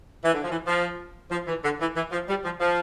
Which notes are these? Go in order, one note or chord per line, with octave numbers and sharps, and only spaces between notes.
E3
D3
F3
E3
F3
F3
E3
D3
E3
E3
F3
G3
F3
F3